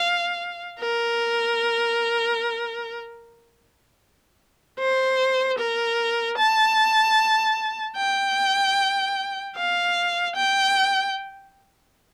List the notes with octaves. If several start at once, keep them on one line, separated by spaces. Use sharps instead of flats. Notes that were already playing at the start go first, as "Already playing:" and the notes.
Already playing: F5
A#4
C5
A#4
A5
G5
F5
G5